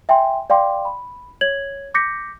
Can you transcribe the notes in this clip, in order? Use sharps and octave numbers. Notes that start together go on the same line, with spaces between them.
E5 G5 G#5 C6
D5 F5 G5 C6 D6
B5
C#5 G#6 F#7
D6 G6 A#6 B6 C#7